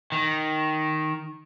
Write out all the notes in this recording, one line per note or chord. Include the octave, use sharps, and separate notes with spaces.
D#3